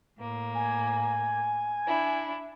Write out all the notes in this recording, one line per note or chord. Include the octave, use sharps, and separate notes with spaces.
A2 A#3
G#5
D4 E4